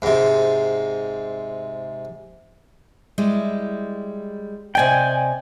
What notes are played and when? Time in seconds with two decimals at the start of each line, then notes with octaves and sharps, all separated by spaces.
0.02 G#2 C3
3.18 G3 G#3 E4
4.75 C3 D5 D#5 G5 G#5